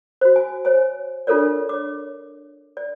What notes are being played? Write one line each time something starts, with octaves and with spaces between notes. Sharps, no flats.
F#4 C5
G#5
C5 C#5 G#5
D4 F4 A4 A#4 C#5 D5
C#5 D6
D5